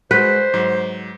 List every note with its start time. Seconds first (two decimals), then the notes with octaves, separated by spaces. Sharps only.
0.11 G#3 F#4 B4 C5
0.54 G#2 F#3